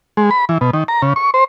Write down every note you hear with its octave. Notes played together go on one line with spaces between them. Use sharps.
G#3
B5
E3
B2
D#3
A#5
C#3
C#6
C5